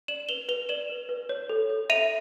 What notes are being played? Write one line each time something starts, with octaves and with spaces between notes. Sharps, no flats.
D5 E7 F#7
B4 F7 G7
B4 F7 G7
D5 E7 F#7
B4
B4
C#5
A4
A4
E5 D#7 F7